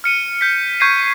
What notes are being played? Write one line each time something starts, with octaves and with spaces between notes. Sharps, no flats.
F6 C#7 D#7
G6 B6
C#6 G6 G#6 B6 C7 D#7